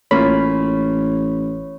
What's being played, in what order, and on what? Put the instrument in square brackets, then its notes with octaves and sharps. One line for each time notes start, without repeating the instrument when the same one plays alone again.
[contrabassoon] A1 [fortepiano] A#3 C#4 F4 [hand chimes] C#5 [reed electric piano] B5